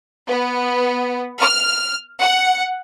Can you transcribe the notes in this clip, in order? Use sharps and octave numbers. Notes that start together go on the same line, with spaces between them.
B3
F6
F#5